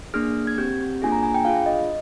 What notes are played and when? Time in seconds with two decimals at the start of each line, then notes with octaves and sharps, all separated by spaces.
0.14 A#3 D4 G#4 F6
0.47 G#6
0.58 C4 G4 G6
1.02 A#3 D4 F4 G#4 G#5
1.12 A#5
1.23 G#5
1.34 G5
1.44 D4 F4 G#4 F5
1.66 D#5